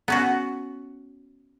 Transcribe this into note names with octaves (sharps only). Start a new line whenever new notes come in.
B3 C#4 F#4